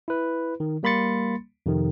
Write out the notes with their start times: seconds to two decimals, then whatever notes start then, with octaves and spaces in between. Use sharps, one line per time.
0.08 E4 B4
0.60 D#3
0.83 G3 A#3 B5 C6 A6 C#7
1.66 F2 C3 D#3